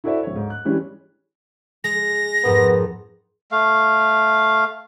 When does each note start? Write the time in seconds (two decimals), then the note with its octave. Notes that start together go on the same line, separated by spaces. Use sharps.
0.04 E4 F#4 A4 C5 D5 E5
0.23 D1 C#5
0.36 G#2
0.50 F#6
0.65 E3 G3 G#3 C#4
1.84 G#3 A#6
2.44 F2 G#2 B3 A#4
3.52 A3 F5